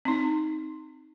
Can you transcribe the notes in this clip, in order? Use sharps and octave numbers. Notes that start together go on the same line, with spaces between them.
C4 D#4